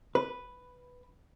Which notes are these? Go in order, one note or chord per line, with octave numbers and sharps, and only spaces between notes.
B4